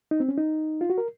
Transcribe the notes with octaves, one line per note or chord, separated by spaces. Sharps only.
D#4
C4
C#4
D#4
F4
F#4
A#4